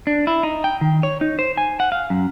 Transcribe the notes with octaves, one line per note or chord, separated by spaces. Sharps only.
D4
E4
D#4
G5
D#3
C#5
D#4
C5
G#5
F#5
F5
F#2